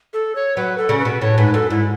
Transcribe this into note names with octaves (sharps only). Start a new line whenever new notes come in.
A4
C#5
F#3 B4
A4
C#3
B4
B2
A2 C#5
G#2 B4
F#2 A4
G#2 E4